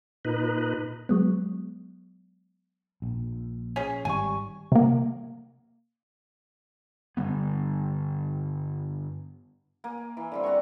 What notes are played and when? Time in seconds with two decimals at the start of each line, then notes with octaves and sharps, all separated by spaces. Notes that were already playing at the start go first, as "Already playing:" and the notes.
0.25 A#2 D#4 B4
1.09 F#3 G#3 B3
3.02 A#1
3.76 C#4 G#4
4.05 G#1 D3 G3 G#5 C#6
4.72 C3 A#3
7.17 G2 D3 G3 B3
9.84 A#3 G#5
10.17 E3
10.32 D3 G3 C4
10.44 D5 F#5 A#5 C#6